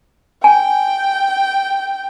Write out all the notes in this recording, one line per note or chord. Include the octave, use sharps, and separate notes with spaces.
G5 G#5